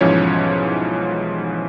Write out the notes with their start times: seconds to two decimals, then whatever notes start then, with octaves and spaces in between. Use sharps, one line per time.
0.01 B1 G#2 E3 F3 C#4 C#5